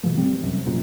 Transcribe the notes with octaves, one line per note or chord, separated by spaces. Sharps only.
B2 E3 F3 A3
G#1 G3 C4
F1 C2 F#2
E1 F#2 A#2